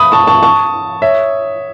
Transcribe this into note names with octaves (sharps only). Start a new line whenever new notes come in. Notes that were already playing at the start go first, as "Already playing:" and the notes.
Already playing: B5 D#6
A5 C#6
A5 C#6
A5 C#6
C#5 E5